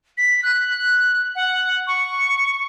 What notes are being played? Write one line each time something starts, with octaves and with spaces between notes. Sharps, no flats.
B6
F#6
F#5
C#6